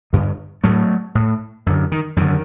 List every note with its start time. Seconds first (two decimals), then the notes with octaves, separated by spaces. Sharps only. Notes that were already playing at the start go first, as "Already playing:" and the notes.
0.13 G2 D3
0.64 A2 F#3 A3
1.15 A2
1.66 F#2 D3
1.92 D#3
2.16 F#2 D3 D#3